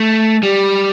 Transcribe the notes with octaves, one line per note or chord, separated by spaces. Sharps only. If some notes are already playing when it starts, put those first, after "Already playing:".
Already playing: A3
G3